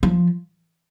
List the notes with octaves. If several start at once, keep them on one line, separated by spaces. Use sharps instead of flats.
F3